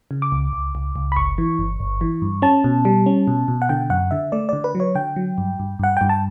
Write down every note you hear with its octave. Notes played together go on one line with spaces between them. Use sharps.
C#3
D6
C#2
C#2
C#2
C#2
B5
G1 C#6
E3
G1
G1
E3
G2
C#4 A5
B2
G3
C#4
B2
B2
F#5
D3 G5
F#2 F#5
D3 E5
A3 D5
D3 D5
B4
F#3
C#5
D3 G5
F#3
G2
G2
G2 F#5
G2 G5
A5